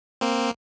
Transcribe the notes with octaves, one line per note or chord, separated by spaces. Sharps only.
A#3 C4